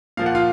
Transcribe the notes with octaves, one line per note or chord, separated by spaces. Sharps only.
A#2 F3 A#3 F5
F#5
F4 F5